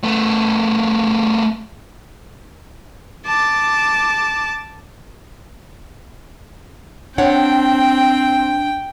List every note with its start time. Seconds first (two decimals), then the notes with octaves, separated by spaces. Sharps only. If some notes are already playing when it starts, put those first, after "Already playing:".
0.04 A3 B3
3.26 A5 D6
7.18 C4 D4 C#5 F#5 G5